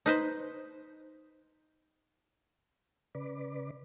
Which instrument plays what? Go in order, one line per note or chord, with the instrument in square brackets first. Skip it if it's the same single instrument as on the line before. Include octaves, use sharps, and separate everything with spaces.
[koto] D#4 B4 C5
[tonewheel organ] C#3 B4 D5